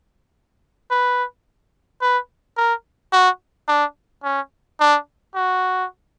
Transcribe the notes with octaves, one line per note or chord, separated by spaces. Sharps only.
B4
B4
A#4
F#4
D4
C#4
D4
F#4